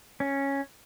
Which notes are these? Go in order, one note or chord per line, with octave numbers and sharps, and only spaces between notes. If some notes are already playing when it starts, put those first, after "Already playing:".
C#4